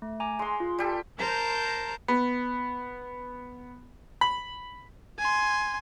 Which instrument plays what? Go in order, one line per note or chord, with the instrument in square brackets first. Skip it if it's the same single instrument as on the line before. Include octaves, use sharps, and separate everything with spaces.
[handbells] A3
G#5 A#5 D6
[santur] G#3 C6
[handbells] F4
[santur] G3 G4 A4
[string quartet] A#4 C5 A5 A#5 G6
[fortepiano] B3
B5
[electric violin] G#5 C6